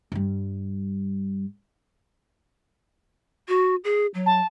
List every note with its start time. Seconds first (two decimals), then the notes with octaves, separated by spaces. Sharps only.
0.12 G2 G3
3.48 F#4
3.84 G#4
4.14 F#3
4.26 A5